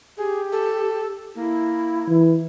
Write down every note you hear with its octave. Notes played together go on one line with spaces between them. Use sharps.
G4 G#4
A4
A#3 E4
E3